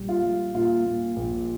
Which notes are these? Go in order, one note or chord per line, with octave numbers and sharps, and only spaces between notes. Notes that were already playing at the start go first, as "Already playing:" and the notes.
Already playing: A#1 G3
F4
G3
A#2 F4
A#2
A#1